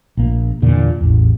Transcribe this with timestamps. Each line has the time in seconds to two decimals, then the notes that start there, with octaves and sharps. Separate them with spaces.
0.17 A#1 A#3
0.62 E2 A#2 D3
1.01 A1 E2